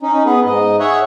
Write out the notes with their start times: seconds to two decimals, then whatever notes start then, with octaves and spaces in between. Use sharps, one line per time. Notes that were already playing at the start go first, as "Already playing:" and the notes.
0.01 C#4 D#4
0.26 B3 G#4 B4
0.45 G#2 D#5
0.80 G#4 C#5 E5 F#5